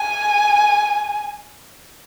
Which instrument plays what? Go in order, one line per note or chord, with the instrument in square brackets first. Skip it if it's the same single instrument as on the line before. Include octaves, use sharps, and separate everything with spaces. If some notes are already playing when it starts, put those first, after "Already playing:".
Already playing: [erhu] G#5